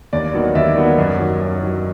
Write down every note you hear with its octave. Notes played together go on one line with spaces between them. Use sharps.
D#2 D5
D#3 F#3 B3
D#2 D5 E5
D#3 F#3 B3
F#2
D#3 F#3
F#2
D#3 F#3